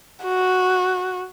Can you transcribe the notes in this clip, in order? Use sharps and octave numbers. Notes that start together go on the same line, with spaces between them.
F#4